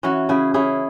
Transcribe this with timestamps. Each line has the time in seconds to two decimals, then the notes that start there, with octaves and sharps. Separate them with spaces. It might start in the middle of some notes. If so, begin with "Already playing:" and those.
0.03 E3 C#4 F#4
0.29 C#3 E4 G#4
0.54 C#4 E4 G#4